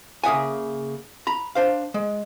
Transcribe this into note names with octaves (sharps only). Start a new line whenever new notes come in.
C#3 A#3 G#4 E5 F#5 G#5
A#5 B5
D4 C5 F5
G#3